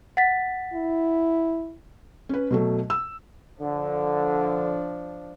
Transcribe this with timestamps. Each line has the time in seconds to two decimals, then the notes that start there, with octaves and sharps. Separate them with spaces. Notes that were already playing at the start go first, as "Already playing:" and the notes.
0.17 F#5 A6 B6
0.74 E4
2.29 C#4 B4
2.51 B2 F#3 A3
2.90 E6
3.61 D3 F3 D4